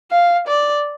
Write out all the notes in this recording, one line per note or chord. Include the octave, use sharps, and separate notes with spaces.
F5
D5